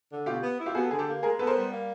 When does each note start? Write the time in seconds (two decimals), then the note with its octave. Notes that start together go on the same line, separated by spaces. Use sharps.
0.10 D3
0.26 B2 F4 G4
0.42 B3
0.58 E4
0.66 F4 G4
0.74 B3 F#4 G#4
0.83 A4
0.91 D3 G#4
0.99 G4 A4
1.07 A#3
1.23 G#3 G#4 A#4
1.39 B3 A4 B4
1.47 A#4 C5
1.55 G3
1.71 A#3